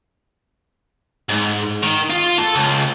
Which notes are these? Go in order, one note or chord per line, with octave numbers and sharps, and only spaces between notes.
G#2
D#3
F4
A4
C#2